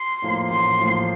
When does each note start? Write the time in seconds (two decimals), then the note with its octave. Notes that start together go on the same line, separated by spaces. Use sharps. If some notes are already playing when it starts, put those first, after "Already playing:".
Already playing: C6
0.22 A2 F3 A#3
0.50 A1 C6
0.80 A2 F3 A#3